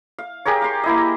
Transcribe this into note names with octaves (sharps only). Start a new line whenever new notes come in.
F5
G4 G#4 A#4 C#5
F5 C6
A#3 E4 D#5